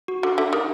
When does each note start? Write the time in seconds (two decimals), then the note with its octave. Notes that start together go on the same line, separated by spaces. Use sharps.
0.08 F#4
0.23 D3 F#4
0.38 D3 E5
0.53 D#3 G4